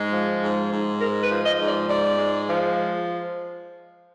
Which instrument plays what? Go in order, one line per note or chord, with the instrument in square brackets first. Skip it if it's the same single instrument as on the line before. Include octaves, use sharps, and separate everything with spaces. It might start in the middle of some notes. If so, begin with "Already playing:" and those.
Already playing: [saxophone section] G#2 G#3
F3
G#2
G#2
G#3 A#4
B4
F3
D#5
G#2
D5
G#2 D5
G#3
F3